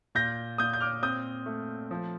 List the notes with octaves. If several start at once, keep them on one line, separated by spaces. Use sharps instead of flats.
A#2 G6 A#6
A#2 D#6 G6
G6
D6 F6
C4 D#6 G6
A3
F3